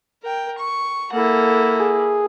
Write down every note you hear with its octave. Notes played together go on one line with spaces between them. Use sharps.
A#4 G5
C#6
A#3 E4 A4 F#5
G#4